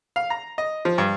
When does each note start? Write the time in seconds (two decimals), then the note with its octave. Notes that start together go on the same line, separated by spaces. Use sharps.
0.16 F5
0.30 A#5
0.58 D#5
0.85 F3
0.98 G2